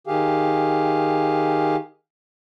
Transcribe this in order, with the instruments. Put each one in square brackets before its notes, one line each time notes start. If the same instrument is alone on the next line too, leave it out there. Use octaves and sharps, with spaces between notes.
[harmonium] D#3 G4 G#4 F5